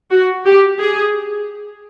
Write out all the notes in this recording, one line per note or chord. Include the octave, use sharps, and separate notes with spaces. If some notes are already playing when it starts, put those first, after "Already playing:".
F#4
G4
G#4